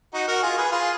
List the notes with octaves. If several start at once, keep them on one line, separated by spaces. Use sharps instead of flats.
D#4 F#4
F#4 A#4
F4 G#4
G#4 B4
F4 G#4